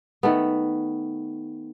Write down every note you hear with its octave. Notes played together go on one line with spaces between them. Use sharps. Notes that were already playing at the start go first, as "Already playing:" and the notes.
D#3 A3 B3